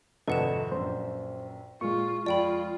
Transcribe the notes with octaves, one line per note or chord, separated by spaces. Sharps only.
G#1 F2 C3 A4 B4 D#5 F#5 E7
A#1 F#2 C5
A#2 G#3 F4 C#6
F2 F4 D5 G5 B5